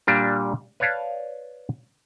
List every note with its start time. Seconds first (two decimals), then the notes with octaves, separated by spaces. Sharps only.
0.07 A#2 G3 A#3 D4
0.80 B4 C#5 D5 F5 A5